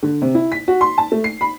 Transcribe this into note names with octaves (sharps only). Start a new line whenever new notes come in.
D3
C3
E4
B6
F#4
C6
A5
A3
C7
B5